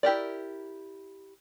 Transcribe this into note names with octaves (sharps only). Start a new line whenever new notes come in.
E4 G4 A#4 D5